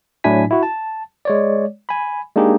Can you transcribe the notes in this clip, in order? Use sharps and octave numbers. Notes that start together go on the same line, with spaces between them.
A2 F#3 D4 E4 G#5 B6
E4 F#4
A5
G#3 C#5 D5
G#5 B5
G#3 A#3 D4 D#4 G4 G#4